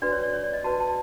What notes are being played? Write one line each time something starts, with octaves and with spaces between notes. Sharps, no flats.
D4 F#4 B4 D5
C#5
D5
C#5
D5
D#5
F#4 B4 A5
A5